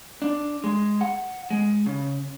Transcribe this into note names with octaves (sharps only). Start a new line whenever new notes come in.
D4
G#3
F#5
G#3
C#3